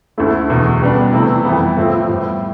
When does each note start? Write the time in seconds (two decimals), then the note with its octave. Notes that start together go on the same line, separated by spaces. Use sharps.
0.18 D2 D3 A3 E4
0.50 E2 B2 A3
0.82 B2 G3 B3 D4
1.13 C3 E3 A3 E4
1.45 F2 E3 G3 B3
1.77 A2 F3 A3 C4
2.08 A2 G3 B3